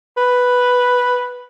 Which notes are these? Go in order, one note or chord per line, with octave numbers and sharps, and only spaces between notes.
B4